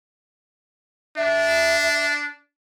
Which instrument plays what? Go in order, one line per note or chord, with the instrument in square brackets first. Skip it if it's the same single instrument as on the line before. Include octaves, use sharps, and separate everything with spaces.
[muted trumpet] D4 [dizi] E5